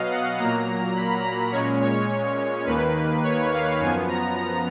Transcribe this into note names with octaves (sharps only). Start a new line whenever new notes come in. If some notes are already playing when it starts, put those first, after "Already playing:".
Already playing: B2 F#3 B3 D#5 F5
F#5
A#2 F#3 A#3 A#5
B5
A#5
A#2 G#3 C#4 C#5
C#5
D#2 D#3 A#3 B4
C#5
F5
F#2 F3 B3 G#5
A#5
A#5